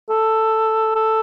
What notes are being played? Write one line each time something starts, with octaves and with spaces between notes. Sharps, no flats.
A4
A4